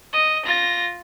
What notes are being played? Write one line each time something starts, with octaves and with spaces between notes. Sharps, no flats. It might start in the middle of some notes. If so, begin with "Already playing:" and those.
D#5
F4 A#6